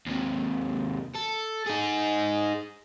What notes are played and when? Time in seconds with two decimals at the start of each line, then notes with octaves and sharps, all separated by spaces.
0.07 D#2 C3
1.15 A4
1.66 D#4 G#4